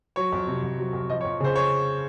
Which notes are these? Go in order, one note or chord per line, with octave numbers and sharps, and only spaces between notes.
F#3 C#5
F2
C3
F2
F#3
F2
F3 D#5
C#5
F2
C#3 C5
C#5